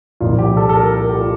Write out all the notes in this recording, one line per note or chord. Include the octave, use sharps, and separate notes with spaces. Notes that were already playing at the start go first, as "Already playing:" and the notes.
C2 A#2 F3 F4
G4
A4
A4
A#4
A#4
G4
F4